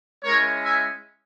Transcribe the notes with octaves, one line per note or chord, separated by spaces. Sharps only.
G#3 C#4 E4 A#4 C#5
E5 G#5